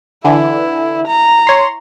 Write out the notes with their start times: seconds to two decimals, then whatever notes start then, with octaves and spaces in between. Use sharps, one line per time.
0.24 D3 E3 E4
1.07 A#5
1.47 C#5 C6